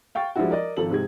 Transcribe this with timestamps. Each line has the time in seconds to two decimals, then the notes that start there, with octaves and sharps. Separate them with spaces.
0.15 F5 G5 C#6 A6
0.36 F3 G3 G#3 D4 E4 F#4
0.51 A#4 D5 D#5
0.77 G#1 F3 A4 F#7
0.90 G#2 C3 G#3 G#6